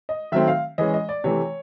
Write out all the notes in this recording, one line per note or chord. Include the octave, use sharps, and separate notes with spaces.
D#5
D#3 F#3 A3 C4 E5
F5
E3 G#3 C#4 D#5
D#5
D5
C3 E3 A3 C#5